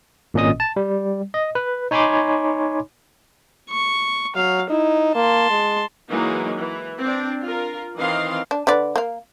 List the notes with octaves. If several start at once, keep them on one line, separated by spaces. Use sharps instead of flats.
G#1 A#2 C#4 D#5 D#6
A5
G3
D#5
B4
D#4 C#5 G#5 B5 C6 D6
C#6
F#3 F5
D#4 E4
A#3 A5 C6
G#3
E3 F#3 G#3 A#3 D#4
E3
C4 D4
F4 A#4
D#3 E3 C4 D#5 F5 C6
D4
D3 B4 D5
A#3 F5